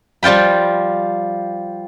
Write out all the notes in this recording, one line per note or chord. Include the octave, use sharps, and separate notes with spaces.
F3 G3 F4 G5 B5